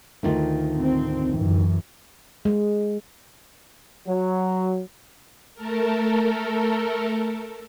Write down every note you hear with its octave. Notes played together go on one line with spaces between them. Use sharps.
D2 D#3 F4
C4
F#2 E3
G#3
F#3
A3 A4 A#4